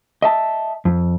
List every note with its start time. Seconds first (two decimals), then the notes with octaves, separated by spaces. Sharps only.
0.22 D#5 E5 A5
0.85 F2